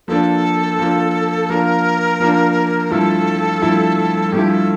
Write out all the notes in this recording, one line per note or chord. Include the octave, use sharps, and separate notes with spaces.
F3 A#3 D4 A4
F3 A#3 D4
F3 A#3 D4 A#4
F3 A#3 D4
G2 F3 A3 E4 A4
G2 F3 A3 E4
G2 F3 A3 E4 G4
A4